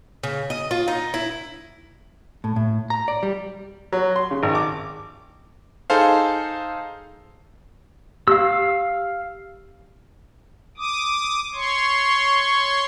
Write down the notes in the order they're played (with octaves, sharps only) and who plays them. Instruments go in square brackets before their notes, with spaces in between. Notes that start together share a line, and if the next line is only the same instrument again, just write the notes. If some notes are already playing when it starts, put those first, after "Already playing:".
[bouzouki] C#3
D#5
F4
D#4
E4
[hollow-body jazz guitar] A2
A2
A#5
D5
G3
[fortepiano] F#3
C6
C#3
G#1
D6
[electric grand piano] D#4 G#4 A4 C5 F5
[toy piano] G4 [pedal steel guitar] F5 E6
[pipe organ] D6 D#6
C#5 C6 C#6